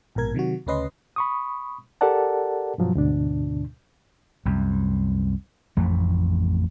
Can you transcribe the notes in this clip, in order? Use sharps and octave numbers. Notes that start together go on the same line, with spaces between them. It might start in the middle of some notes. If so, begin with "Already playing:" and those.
A#1 G#2 B2 A#4 G#6
C3 D#3 F#3 F#4
D2 C#3 C#4 B4 D#5 C6
B5 C#6 D#6
G4 A4 A#4 D5 F#5 A5
G2 B2 F3 F#3
D2 G#2 B2 D3 D4
C2 F#2
A1 F2 A3